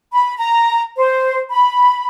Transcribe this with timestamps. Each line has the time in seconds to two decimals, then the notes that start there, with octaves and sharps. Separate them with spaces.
0.12 B5
0.37 A#5
0.96 C5
1.50 B5